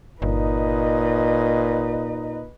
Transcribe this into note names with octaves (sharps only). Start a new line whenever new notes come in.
G1 A#2 D#4 B4 D#5